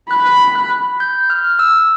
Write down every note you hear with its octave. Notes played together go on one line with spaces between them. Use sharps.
B5 F#6
F#6
G6
F6
E6